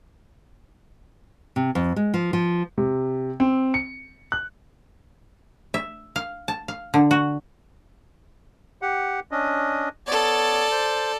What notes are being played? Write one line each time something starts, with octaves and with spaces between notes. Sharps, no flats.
C3
F2
G#3
F3
F3
C3
C4
C#7
F#6
E5
F5
A5
F5
D3
F#4
G4 F#5
C#4 D4 D#5
B3 A4 C#5 D5
C5